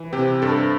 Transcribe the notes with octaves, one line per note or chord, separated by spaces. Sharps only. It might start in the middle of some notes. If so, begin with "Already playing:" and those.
Already playing: E3
C3 G4
G2 A4